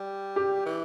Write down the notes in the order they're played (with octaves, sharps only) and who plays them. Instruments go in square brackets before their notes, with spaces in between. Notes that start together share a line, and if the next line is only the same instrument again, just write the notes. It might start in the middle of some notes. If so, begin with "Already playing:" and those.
Already playing: [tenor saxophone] G3
[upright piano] G4
[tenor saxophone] E3